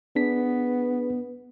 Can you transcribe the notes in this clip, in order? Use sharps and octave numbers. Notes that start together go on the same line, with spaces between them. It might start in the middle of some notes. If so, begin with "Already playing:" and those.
B3 D4 G#4 B6